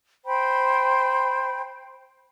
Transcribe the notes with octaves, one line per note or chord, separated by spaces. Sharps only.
C5 G5 B5